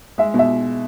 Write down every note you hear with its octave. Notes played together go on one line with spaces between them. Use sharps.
G#3 E5
B2 E5